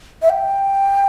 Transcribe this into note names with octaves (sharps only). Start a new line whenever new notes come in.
E5
G5